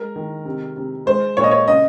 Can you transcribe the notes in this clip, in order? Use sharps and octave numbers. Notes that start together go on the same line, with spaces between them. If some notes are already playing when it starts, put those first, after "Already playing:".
Already playing: G#3 A#4
D#3
C3
C3
G#3 C5
A#2 C#5
D#5
C#5
C#3 D#5